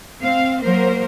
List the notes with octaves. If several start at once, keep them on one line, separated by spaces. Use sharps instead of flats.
C4 F5
F#3 A#3 A#4 C5